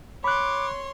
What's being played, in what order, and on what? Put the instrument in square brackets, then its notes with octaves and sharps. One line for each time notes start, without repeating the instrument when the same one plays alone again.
[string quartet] C#5 C6 [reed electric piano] B5 F#6 [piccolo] D6